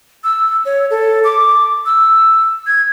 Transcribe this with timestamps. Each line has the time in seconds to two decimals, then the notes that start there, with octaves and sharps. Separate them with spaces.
0.24 E6
0.65 C#5
0.90 A4
1.24 D6
1.86 E6
2.67 G#6